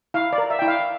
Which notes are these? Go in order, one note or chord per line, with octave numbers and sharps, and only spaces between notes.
E4 F5
D5
A#4
E5
E4 G5
F5